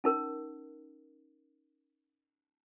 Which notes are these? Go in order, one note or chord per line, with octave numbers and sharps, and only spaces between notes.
C#4 D#4 A#4